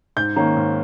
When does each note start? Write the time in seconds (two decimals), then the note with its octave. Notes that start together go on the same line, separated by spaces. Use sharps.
0.16 G#2 G6
0.36 D#3 A#3 C#4
0.56 G#2